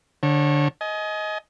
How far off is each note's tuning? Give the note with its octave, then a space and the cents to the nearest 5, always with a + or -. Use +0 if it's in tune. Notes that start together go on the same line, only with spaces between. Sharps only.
D3 +0 C#5 -30
D#5 +15 G#5 +35